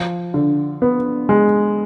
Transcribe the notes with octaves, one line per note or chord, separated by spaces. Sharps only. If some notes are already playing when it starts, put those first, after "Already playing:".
Already playing: F3
D3
B3
G#3